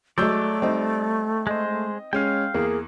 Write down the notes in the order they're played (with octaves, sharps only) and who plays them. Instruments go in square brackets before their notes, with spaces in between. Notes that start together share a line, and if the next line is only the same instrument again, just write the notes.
[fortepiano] F#3 G#3 [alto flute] A3 [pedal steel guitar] D5 [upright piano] C#6 E6 G6
[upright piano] G3 [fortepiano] C4 D#4
[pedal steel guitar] G#3 C5 [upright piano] D#5
[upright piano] G#3 C#4 [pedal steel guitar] F5 G5
[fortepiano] E2 [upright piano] A#3 [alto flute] G#4